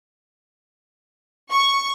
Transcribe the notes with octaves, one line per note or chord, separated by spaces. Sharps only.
C#6